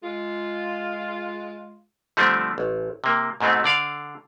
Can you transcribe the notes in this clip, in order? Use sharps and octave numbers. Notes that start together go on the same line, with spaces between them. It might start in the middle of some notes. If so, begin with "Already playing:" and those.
G#3 F4
D3 F3 G3 A3 C4 D4
A1
C3 A#3
G#2 B2 G#3 A3 C4
D3 D5 F5